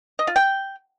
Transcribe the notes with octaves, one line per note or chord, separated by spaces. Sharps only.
D#5
F4
G5